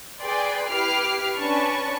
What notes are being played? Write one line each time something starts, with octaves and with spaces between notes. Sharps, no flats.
G#4 B4 D5 G5 C6
E4 G4 B4 D6 F6 C7
C#4 D4 B4 A5 C#6